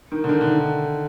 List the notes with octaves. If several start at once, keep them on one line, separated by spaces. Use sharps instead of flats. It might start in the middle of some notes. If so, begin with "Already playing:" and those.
D#3
D3
D#3
D3
D#3